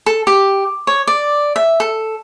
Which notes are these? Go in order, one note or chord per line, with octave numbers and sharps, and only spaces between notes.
A4
G4
C#5
D5
E5
A4